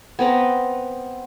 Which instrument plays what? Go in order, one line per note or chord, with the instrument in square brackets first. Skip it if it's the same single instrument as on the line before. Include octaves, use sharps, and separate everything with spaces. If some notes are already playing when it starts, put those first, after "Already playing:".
[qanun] B3 C4 B4 A#5